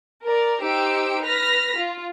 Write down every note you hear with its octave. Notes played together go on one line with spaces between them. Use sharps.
A#4 D5
D#4 G4 C5 E6 D7
B4 F6 A#6 B6
F4